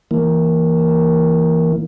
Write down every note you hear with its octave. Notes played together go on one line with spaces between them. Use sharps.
E3 A#3